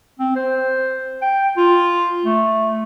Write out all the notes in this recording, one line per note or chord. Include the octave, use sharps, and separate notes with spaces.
C4
C5
G5
F4
A3